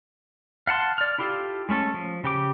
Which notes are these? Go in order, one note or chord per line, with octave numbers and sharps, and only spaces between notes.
F5 F#5 A5 C6
D5 F6
E4 F4 G4 A4 F5
G#3 A3 C#4 A4
F3
C#3 G4 D6